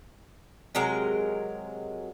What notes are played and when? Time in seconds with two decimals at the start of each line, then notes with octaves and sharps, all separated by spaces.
0.75 C3 F#3 G#3 A#4